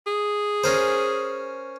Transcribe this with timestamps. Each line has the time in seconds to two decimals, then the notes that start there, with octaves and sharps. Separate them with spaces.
0.07 G#4
0.64 C#4 A#4 C5